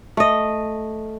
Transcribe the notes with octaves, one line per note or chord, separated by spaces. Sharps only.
A3 D#5